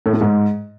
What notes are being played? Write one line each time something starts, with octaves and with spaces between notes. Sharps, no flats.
A2
A3
G#2